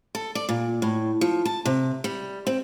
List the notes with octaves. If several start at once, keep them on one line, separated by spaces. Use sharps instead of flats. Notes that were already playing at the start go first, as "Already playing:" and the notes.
A4
D5
A#2
A2
F3
A5
C3
G3
C4